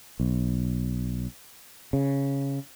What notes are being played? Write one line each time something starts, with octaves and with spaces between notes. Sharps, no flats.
B1
C#3